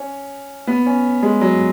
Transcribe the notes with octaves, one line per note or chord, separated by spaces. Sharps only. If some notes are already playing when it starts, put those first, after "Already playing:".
Already playing: C#4
B3
C#4
G#3
F#3